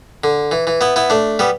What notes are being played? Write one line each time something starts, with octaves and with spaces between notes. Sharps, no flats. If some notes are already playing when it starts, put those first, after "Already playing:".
D3
E3
E3
B3 E4
B3 E4
A3 D4
G3 B3